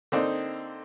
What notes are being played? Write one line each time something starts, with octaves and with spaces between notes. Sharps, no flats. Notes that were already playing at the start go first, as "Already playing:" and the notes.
D3 A#3 C4 D4 D#4